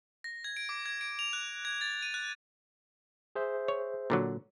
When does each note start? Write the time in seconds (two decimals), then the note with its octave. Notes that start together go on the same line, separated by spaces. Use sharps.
0.24 A#6
0.44 G#6
0.57 D7
0.69 D6
0.86 G#6
1.01 D7
1.19 F7
1.33 F#6
1.65 G#6
1.81 A6
2.02 D#7
2.14 F#6
3.35 G#4 C5 E5
3.68 C#5
4.10 A#2 D3 F#3